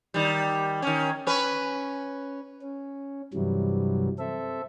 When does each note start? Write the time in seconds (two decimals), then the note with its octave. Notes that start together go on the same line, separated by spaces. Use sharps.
0.14 D#3 G3
0.82 D#3 C#4
1.27 C#4 B4
2.62 C#4
3.34 G2 C3 E3 F#3 G3
4.19 C4 A4 E5